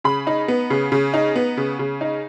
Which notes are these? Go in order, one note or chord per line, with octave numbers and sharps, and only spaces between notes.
C#3 B5
D#4
B3
C#3
C#3
D#4
B3
C#3
C#3
D#4